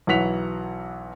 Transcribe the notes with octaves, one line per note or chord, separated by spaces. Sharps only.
B1 E3 F#3 F#5 B6 F7